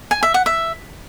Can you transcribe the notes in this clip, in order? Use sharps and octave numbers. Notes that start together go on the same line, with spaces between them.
G#5
E5
F#5
E5